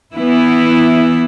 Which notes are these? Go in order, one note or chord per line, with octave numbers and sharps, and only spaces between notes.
E3 B3 E4